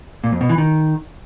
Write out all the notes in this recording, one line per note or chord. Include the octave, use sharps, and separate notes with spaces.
A#2
F2
B2
E3
D#3